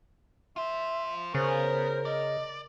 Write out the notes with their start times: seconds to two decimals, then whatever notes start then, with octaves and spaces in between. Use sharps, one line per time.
0.56 F4 C5 E5
1.35 C#3 B3 A#4 C5
2.05 D5 D#5